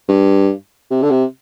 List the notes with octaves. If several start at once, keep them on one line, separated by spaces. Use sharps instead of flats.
G2
C3
D3
C3